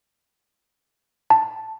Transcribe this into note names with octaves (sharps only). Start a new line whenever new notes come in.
A5